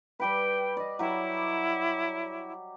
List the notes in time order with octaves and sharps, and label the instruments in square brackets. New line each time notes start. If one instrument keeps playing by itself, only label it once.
[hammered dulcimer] G3 G4 B4 [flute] G5
[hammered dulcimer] D5 D#5
[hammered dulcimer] F#3 G4 [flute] E4